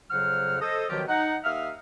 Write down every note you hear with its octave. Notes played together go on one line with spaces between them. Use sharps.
F2 C#3 F#3 C5 F#5 F6
A4 C5 D#5
B2 D#3 F3 F#3 F4 G4
D#4 F#5
D#2 E5 F5 D#6 F6